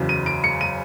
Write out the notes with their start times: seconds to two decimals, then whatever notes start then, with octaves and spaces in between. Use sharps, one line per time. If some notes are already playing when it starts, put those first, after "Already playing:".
Already playing: F#1 E2 C#3 F#3
0.09 D#7
0.26 D7
0.44 C#7
0.61 D#7